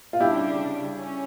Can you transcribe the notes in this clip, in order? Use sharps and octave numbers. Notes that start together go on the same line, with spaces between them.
F4
C#3 G3 D4 E4 G4
C#4